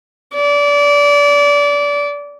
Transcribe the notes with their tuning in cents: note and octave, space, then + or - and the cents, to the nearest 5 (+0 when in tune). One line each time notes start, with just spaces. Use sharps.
D5 -25